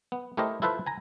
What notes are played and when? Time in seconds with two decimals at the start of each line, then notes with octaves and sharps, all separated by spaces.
0.12 B3
0.37 A3 E4 G4 A#4 C5 D#5
0.62 E4 F4 A4 B4 C5 E5
0.86 G#5 A#5